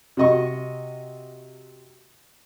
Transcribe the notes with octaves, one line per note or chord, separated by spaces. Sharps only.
C3 F#4 D#5 C#6